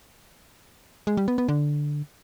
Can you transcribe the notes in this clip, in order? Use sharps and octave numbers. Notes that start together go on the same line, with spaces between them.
G#3
G3
B3
B3
D3